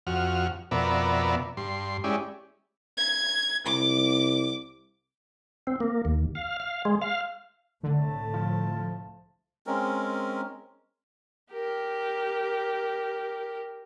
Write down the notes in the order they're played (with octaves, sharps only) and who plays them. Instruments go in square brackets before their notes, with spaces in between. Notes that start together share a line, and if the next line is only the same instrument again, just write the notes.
[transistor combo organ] F2 F#4 F6
F2 B2 B3 A#4 D5 E5
G2 C6
G#3 C#4 E4 G4 D5
[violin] G#6
[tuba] C2 [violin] D6
[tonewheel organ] C4
A#3
D#2
F5
F5
G#3
F5
[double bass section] C2 A2 A3 [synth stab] D3 [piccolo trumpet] A5
[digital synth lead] F3
[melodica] G#3 C4 C#4 A#4
[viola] G4 A#4